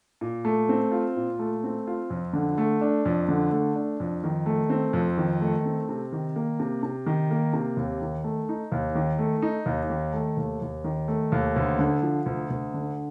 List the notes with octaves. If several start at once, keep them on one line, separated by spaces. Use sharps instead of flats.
A#2
A3
C4
F4
A#2
A3
C4
F4
F2
D3
A3
D4
F2
D3
A3
D4
F2
D#3
A3
C4
F2
D#3
A3
C4
C3
D#3
A#3
C3
C3
D#3
A#3
C3
D#2
D#3
A3
D#4
D#2
D#3
A3
D#4
D#2
D#3
A3
D#2
D#2
D#3
A3
D#2
D2
D3
F3
D2
D2
D3